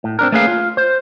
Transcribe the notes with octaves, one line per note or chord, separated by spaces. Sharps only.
A2
C4 D4 A#4
A3 A#3 C#4 G#4 B4 F5
F4
C5